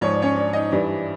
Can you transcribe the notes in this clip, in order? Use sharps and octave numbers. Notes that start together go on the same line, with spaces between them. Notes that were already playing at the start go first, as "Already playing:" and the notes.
G#2 F3 C#5
D5
C#4 C#5
D4 D5
D#4 D#5
G2 E3 D4 D5